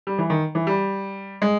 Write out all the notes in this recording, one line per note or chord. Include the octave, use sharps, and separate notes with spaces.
G3
E3
D#3
E3
G3
G#3